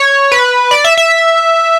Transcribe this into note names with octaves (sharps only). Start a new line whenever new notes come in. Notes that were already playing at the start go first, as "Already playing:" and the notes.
Already playing: C#5
B4
D5
E5
E5